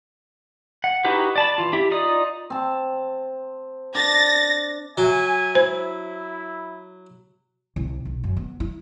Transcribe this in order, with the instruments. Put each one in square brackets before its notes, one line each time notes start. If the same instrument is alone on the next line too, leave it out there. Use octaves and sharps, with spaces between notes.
[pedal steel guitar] F#5
D#4 E4 F#4 G4 B4
D5 A5 B5
E3 F4
E4 G4
D#4 F4 D5 D#6
[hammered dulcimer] C4 A5
[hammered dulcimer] D4 [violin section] A6 A#6
[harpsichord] F#3 [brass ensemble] E5 G#5
[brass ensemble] E4 [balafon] C5
[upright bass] C2
B1
F#2
B3
E4